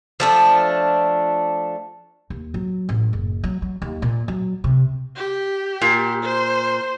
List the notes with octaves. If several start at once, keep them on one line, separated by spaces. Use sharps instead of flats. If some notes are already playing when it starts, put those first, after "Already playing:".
F3 A3 D4
D#2
F#3
A1
F#1
F#3
F#3
D#2
A#2
F#3
C3
G4
A#2
C5